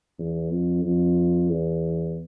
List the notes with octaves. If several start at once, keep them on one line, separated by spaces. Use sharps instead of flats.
E2
F2
F2
E2